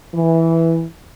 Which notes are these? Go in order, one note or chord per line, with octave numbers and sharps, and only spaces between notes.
E3